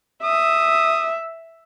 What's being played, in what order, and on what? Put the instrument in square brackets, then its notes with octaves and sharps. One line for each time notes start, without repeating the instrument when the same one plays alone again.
[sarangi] E5 [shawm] D#6